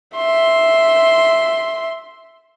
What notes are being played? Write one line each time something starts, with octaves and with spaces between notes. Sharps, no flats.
E5 C6